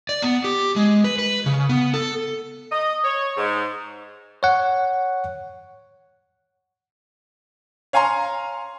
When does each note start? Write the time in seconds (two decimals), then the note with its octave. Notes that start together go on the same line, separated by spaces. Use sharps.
0.09 D5
0.22 B3
0.44 G4
0.76 G#3
1.04 B4
1.19 B4
1.46 C#3
1.69 B3
1.94 A4
2.71 D#5
3.04 C#5
3.37 G#2
4.43 C#5 F#5
7.93 C#5 F5 G#5 A#5 C6